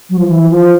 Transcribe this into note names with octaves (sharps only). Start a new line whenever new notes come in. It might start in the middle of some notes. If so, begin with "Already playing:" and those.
F#3
F3
E3
F3